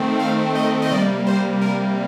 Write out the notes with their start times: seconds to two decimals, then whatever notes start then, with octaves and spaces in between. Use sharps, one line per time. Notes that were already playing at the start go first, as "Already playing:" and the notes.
Already playing: D#3 A3 C4
0.19 F5
0.55 D#5
0.82 D#5
0.91 C3 G3 A#3 D5
1.26 C5
1.61 A#4